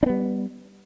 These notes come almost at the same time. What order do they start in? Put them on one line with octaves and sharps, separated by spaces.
D4 B3 G3